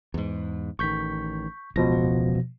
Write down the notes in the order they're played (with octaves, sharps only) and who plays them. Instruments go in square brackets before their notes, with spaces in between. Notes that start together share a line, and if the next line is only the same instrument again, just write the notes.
[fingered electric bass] E2 G#2
[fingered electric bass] A1 D#3 [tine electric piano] C#6 G6 B6
[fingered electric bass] E1 C#2 [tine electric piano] B2 F3 A#6